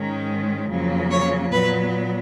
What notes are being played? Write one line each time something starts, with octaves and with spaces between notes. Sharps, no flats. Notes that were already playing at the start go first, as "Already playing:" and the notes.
Already playing: G#2 D#3 G#3 C#4
F2 C#3 F#3 A#3
C#5
A#2 F#3 B3 B4